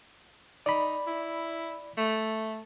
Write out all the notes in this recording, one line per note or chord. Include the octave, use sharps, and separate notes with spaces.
D#4 D5 B5
E4
A3